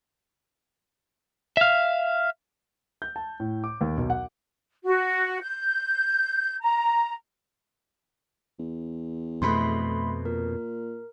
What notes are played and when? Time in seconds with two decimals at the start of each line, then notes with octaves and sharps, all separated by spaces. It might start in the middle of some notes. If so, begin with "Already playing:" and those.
1.57 E5 F5
3.02 G6
3.16 A5
3.40 A2
3.64 D6
3.81 D#2
3.97 B1
4.10 F#5
4.85 F#4
5.42 G6
6.61 A#5
8.59 E2
9.42 F2 B2 A3 B5 C6
10.25 A#2 A#4